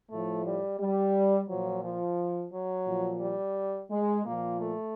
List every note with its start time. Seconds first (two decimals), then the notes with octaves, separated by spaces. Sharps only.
0.11 A2 F3 A3
0.46 G3
0.80 G3
1.48 A#2 F3 F#3
1.84 F3
2.52 F#3
2.87 A#2 F3
3.21 G3
3.91 G#3
4.25 A#2 F3 A#3
4.60 A3